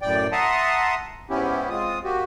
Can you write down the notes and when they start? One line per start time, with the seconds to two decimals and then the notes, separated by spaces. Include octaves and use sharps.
0.02 F#2 A2 D5 G5
0.32 E5 F#5 A5 A#5 C6 D#6
1.30 G#2 B3 C#4 E4 G4
1.69 G#3 C4 F4 D#6
2.04 A#3 F#4 G4